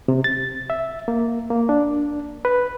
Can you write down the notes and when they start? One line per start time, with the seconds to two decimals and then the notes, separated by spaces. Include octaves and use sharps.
0.08 C3
0.24 A6
0.70 E5
1.08 A#3
1.51 A#3
1.69 D4
2.45 B4